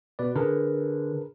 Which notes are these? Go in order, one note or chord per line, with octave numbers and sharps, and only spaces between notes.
B2 B4 D5
D3 G#4 A#4 B4